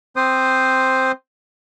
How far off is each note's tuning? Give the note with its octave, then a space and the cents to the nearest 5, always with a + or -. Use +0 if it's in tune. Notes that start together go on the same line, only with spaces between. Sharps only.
C4 +0 C5 +0 D#6 -20